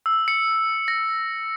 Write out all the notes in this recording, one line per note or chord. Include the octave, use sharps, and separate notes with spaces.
E6
C#7
A#6